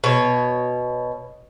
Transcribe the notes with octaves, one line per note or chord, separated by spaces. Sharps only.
B2 C#5